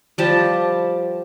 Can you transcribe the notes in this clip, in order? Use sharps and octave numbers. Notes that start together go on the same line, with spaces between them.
F3 G3 A5